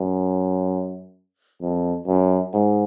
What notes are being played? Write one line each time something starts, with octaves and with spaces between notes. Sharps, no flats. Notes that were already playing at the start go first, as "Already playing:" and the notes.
Already playing: F#2
F2
F#2
G#2